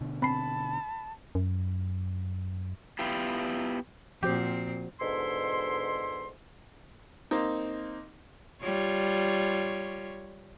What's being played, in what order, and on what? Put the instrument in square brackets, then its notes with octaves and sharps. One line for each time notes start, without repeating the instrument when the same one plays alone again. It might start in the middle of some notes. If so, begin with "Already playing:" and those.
[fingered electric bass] B2 D3
[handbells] C4 C7 [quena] A5 [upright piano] B5
[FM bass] F#2
[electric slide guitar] B3 E4 F4 G4
[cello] A#2 C4 [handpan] F3 F#4 C5 [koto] G4
[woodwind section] G#2 B2 D3 E4 C6
[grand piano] A#3 C4 D#4
[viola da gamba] G3 F4 C#5